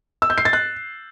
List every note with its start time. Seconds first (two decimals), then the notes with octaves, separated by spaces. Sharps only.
0.22 E6
0.30 G6
0.38 C7
0.45 A6
0.53 F#6